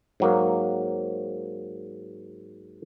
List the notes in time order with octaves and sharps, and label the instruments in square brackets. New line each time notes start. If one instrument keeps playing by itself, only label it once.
[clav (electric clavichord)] G#2 F#3 A#3